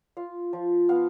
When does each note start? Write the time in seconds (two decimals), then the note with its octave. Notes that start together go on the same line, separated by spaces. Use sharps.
0.17 F4 F5
0.53 F3
0.89 B3 F5